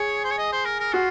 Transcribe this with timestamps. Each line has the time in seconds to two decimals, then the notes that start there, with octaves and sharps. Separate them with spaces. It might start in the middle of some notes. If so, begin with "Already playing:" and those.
Already playing: G#4 C#5
0.24 C5
0.31 C#5
0.38 D#5
0.52 C5
0.65 A#4
0.80 A#4
0.93 F4 F#4